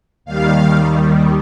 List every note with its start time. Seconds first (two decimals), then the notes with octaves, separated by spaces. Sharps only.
0.25 D#2 D#3 G3 F5